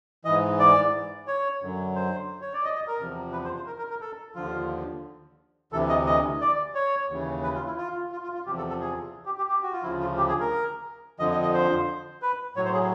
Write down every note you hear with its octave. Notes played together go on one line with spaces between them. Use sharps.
G#2 E3 D#5
D5
C#5
F#2 D3 F#3
C5
C#5
D5
D#5
D#5
A#4
E2 C3 F3
B4
C5
C5
A#4
A#4
A#4
A4
D#2 D3 F3 F4
D2 C3 E3 A4
D#5
D#5
D5
C#5
D#2 C#3 E3
B4
F4
E4
F4
F4
F4
F4
E2 C3 F3 G4
A4
A4
G#4
G4
G4
G4
F#4
F4
D2 C#3 F3 E4
F4
G4
G#4
A#4
F2 D3 F3 D#5
D#5
D#5
C5
B4
A2 F#3 C#5
C5
G#4